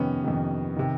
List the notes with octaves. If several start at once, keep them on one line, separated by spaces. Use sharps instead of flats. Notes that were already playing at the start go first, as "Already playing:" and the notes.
Already playing: F2 C3 D#3 B3 C#4
F2 C3 D#3
C3 D#3